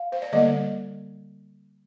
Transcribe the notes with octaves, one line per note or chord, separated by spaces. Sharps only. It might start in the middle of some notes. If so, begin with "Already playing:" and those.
Already playing: F5
C5
D5
D3 G3 A#3 D#5